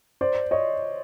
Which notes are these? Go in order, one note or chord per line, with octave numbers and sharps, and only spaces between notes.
C5 D5
C#5 D#5